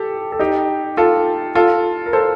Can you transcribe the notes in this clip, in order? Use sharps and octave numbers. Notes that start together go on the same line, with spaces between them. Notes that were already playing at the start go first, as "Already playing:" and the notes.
Already playing: G4 A4
A4
D#4 G4
F4 A4
F4 A4
A#4
A4 C5